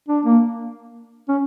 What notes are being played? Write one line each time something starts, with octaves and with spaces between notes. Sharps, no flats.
D4
A#3
C#4